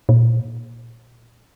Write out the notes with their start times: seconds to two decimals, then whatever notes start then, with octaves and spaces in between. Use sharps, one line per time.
0.09 A#2